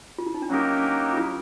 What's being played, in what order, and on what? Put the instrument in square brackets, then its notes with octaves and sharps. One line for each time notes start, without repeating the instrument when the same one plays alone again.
[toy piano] F4
E4
D#4
D4
[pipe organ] F#3 A#3 D#4 G4 A#4 [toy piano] C#4
[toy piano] D4
F4
E4